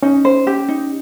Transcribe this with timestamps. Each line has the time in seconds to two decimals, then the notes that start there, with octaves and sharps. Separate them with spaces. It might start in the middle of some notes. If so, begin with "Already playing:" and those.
0.03 C#4 D#4
0.25 C5
0.47 G4
0.69 D#4